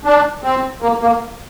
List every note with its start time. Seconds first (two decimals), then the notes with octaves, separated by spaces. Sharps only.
0.05 D4
0.44 C4
0.82 A#3
1.02 A#3